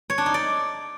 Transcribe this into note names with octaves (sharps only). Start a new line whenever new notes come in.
C#5
D4
D#4
D5